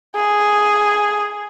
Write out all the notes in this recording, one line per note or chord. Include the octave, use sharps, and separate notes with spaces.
G#4